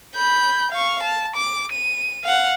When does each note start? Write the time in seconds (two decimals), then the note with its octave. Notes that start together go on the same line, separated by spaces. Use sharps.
0.16 B5 G6
0.71 F5 C#6
1.03 A5
1.36 D6
1.72 D#7
2.24 F5 F#5